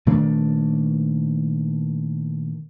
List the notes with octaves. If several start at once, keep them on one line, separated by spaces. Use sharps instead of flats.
A#2 D#3 A3 D4